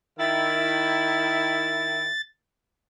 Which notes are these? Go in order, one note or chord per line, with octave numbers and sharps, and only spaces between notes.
D#3 E4 A6